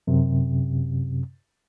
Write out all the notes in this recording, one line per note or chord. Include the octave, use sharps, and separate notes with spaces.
F#2 C3